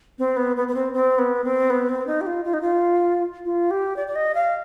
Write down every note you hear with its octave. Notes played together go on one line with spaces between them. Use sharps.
C4
B3
B3
B3
C4
C4
B3
C4
B3
C4
D#4
G4
F4
F4
D#4
F4
F4
G4
D5
D5
D#5
F5